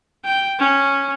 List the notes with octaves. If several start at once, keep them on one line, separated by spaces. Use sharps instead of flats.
G5
C#4